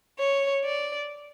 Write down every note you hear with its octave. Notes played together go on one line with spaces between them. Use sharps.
C#5
D5